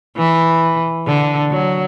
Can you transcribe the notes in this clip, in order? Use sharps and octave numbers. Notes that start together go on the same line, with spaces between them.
E3
D3
F#3